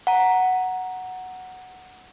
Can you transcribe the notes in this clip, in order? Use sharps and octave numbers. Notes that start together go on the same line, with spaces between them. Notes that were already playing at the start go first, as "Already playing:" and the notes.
F#5 A#5